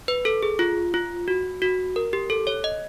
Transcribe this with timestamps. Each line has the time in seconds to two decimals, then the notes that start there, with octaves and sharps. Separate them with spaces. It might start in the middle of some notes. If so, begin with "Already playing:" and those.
0.08 B4
0.25 A4
0.43 G#4
0.59 F4
0.94 F4
1.28 F#4
1.62 F#4
1.96 A#4
2.13 G4
2.30 A4
2.47 C#5
2.64 D#5